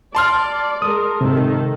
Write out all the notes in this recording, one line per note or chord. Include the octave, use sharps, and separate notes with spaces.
D5 A5 C6 F6
G#3 A#4 D#6
G#2 C3 D#3 A4